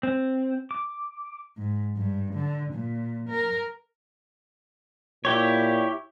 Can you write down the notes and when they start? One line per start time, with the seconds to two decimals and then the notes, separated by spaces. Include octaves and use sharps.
0.03 C4
0.71 D6
1.58 G#2
1.97 G2
2.35 D3
2.74 A#2
3.29 A#4
5.25 A#2 E4 G4 C#5